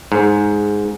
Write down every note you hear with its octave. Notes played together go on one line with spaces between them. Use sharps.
G#2